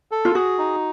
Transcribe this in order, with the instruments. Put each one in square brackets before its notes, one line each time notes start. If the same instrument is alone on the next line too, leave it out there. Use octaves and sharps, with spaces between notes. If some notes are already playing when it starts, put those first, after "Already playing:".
[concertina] A4
[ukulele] F4
[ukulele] F#4 [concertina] G#4
[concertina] D#4